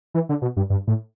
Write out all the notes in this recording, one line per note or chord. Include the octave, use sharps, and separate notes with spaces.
E3
D3
B2
G2
G2
A2